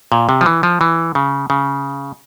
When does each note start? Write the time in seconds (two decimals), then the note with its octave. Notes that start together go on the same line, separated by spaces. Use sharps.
0.12 A#2
0.29 C3
0.41 F3
0.46 E3
0.63 F3
0.81 E3
1.15 C#3
1.50 C#3